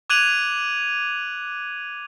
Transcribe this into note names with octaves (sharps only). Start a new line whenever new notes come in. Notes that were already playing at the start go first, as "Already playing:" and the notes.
D6 F#6 G#6 D#7 F7 F#7